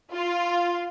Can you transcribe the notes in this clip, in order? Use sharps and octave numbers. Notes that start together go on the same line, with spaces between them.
F4